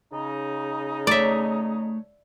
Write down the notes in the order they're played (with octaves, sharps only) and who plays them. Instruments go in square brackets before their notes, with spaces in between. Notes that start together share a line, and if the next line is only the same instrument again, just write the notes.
[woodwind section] C#3 D#4
[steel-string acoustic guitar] A3 C#5 [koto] D5 E5